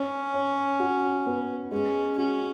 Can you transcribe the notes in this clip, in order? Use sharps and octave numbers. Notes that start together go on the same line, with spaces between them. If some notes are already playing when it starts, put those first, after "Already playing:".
Already playing: C#4 C#5
C#5
F#4
B3
G#3 C#4
C#4 F#4